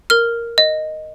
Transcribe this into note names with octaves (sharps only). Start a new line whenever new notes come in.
A#4 F6
D#5